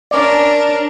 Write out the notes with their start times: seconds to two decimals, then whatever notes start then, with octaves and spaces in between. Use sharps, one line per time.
0.11 C#4 D4 A#4 D5